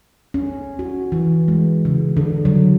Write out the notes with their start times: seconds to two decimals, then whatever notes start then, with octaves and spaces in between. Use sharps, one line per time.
0.34 C#4
0.79 F#4
1.12 E3
1.48 G#3
1.85 C#3
2.17 D3
2.45 F#3